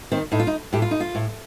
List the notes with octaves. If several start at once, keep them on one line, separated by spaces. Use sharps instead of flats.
D#3 C4
A2 D#4
F4
D#4
A2 G4
F4
D#4
F4
A2